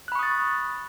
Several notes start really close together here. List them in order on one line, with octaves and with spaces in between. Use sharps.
F#6 B5 C#6 D#6 A6